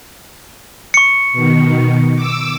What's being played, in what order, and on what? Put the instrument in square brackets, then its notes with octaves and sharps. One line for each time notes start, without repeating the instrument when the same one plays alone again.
[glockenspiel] C#6 C#7
[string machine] B2 D#3
D6 E6